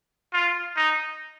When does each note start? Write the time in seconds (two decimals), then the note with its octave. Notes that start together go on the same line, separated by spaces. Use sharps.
0.33 F4
0.77 D#4